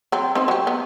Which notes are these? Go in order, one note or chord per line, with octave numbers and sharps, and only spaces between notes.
F#3 C4
C4 D#4 C5
F#3 G4
B3